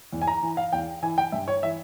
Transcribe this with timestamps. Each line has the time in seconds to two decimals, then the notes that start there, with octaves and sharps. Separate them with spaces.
0.13 E2
0.22 G#5
0.27 A#5
0.43 E3
0.57 F5
0.73 E2 G5
1.02 E3 G#5
1.18 G5
1.32 G2 E5
1.48 C#5
1.62 E3 E5